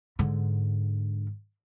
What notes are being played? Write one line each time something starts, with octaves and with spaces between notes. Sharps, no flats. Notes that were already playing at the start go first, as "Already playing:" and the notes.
G#2 D3